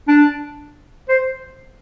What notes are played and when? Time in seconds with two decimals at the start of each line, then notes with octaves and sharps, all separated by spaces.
0.08 D4
1.09 C5